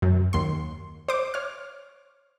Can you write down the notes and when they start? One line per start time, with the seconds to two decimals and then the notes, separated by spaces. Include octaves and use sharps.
0.02 F#2
0.33 D#2 C6
1.08 C5 D6
1.34 C#5 F6